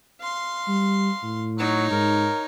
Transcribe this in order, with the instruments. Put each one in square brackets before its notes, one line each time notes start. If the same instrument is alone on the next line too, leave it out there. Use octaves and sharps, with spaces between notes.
[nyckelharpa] F5 C6
[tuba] G3
A2
[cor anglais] F#3 [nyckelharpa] D#4 C#5
[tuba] G#2 [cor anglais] A#4